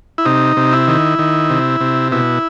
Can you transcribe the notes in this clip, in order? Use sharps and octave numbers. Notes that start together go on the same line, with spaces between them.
E4
C3 D#4
C3
E4
D#3
D#3
C3
C3
B2 E4